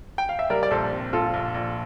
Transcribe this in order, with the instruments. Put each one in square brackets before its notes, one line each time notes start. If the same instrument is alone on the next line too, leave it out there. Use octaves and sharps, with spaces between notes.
[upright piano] G5
F5
E5
[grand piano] G3 [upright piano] A#4 D5
[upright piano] D5
[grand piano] A#1 [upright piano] A4 C5
[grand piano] C4
[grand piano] A#1 [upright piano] F4 A4
[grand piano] A#1
A#1